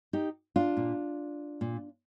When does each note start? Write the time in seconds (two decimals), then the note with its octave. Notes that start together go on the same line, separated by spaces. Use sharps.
0.13 D#4 G4
0.56 D4 F4
0.77 A#2
1.61 A#2